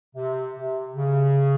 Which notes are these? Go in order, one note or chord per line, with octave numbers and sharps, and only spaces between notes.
C3
C3
C#3